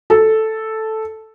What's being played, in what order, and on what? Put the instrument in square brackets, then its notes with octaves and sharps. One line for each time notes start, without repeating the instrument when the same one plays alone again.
[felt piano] A4